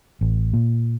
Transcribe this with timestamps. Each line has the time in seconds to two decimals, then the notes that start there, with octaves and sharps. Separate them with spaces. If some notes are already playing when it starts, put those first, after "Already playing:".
0.21 A1
0.53 A#2